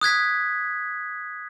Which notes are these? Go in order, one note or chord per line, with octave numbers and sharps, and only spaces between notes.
D#6 F#6 G#6 B6